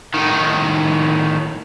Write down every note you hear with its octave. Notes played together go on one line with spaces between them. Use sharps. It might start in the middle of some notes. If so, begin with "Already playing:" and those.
A2 D#3